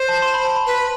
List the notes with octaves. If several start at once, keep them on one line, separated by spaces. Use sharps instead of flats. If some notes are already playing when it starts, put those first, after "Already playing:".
Already playing: C5
A5
C6
B5
A5
B5
B4